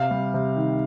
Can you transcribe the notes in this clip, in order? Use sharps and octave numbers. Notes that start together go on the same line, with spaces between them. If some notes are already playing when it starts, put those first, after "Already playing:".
Already playing: C3 F5
G3
C3
D#3